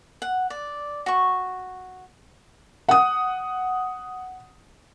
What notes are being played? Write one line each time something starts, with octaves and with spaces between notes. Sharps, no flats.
F#5
D5
F#4 C#6
F#5 D#6